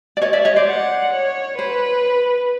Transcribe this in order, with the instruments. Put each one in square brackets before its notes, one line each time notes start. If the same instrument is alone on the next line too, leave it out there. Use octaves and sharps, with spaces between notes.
[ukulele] D5
C#5 D#5
D5 E5
C#5 D#5
C5 D5
[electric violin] F#5
C#5
[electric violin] B4 [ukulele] C5